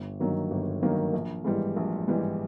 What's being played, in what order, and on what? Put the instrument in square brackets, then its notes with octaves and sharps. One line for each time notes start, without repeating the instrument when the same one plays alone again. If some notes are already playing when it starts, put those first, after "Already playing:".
Already playing: [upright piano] G1
G2 D#3 F#3 A#3
G1
G2 D#3 F#3 A#3
A#1
G#2 E3 G3
A#1
G#2 E3 G3